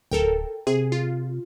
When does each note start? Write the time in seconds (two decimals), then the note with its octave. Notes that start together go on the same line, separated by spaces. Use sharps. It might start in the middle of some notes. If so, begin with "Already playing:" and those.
0.12 D1 A4 A#4 G5
0.67 C3 G#4
0.92 F4